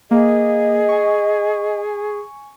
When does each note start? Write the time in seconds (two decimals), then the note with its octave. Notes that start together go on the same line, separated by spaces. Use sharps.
0.11 A#3 G#4 D#5
0.88 G#5 C#6